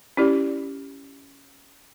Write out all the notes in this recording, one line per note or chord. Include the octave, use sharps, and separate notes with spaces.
C#4 E4 G4 D5